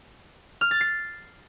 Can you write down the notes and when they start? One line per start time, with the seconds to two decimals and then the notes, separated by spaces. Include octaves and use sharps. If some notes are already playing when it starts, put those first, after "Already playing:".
0.61 F6
0.71 A6
0.81 C7